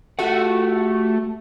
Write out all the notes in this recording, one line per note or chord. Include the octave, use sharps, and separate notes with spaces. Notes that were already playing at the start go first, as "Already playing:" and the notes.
A3 F#4 G4 F#5